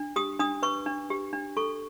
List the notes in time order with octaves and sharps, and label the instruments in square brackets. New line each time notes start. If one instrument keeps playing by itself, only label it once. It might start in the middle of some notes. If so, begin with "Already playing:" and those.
Already playing: [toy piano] D4
G4 D#6
D4 D#6
B4 C#6
D4
G4
D4
A4 C#6